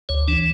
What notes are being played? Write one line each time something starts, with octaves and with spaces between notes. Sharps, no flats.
D2 C#5
E3 D4